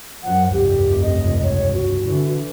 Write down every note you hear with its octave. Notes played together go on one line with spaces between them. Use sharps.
F#2 F3 F#5
F1 C#2 G2 G4
D#5
C#5
F#4
D3 E3